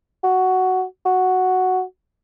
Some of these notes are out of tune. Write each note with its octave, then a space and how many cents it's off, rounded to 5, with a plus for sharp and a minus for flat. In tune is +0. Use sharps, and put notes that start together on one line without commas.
F#4 +5
F#4 +0